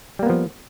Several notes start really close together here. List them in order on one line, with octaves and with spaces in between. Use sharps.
G3 A#3 B3 F3